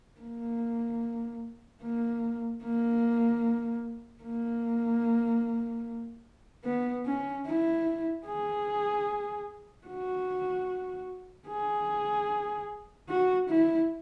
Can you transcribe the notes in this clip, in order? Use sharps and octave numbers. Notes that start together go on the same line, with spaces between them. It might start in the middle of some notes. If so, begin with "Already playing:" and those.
A#3
A#3
A#3
A#3
B3
C#4
E4
G#4
F#4
G#4
F#4
E4